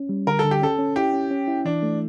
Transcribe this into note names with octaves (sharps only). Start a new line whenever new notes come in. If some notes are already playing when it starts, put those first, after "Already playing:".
Already playing: C#4
G3
D3 A#4
A4
D3
G4
C#4 A4
C#4
E4 G4
C#4
C#4
E4
E3 D4
A3